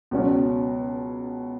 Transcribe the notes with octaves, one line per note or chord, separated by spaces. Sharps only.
C#2 B2 F#3 C#4